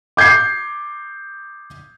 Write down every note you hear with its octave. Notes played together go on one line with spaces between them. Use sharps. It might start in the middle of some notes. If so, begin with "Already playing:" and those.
D6 G6 G#6 C7